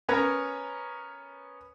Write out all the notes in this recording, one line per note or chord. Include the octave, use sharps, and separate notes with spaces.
B3 C#4 A#4 B4 C#5 A#5